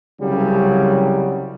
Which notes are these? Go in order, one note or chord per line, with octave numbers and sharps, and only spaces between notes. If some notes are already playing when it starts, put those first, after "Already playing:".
C2 C#3 F#3 G3